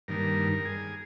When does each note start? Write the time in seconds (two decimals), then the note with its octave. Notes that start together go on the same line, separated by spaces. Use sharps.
0.08 G2 D#3 A#3 A#4
0.65 G#4